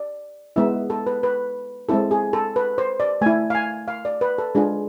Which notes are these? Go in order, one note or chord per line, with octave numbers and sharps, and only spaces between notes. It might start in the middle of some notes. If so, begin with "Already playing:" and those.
Already playing: D5
G#3 B3 E4 E5
A4
B4
B4
G#3 C4 E4 A4
G#4
A4
B4
C5
D5
A3 E4 G#5
F5
G#5
F5
D5
B4
A4
G#3 D4 F4 G#4